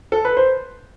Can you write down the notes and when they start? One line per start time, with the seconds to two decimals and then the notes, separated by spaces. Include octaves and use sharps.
0.12 A4
0.25 B4
0.37 C5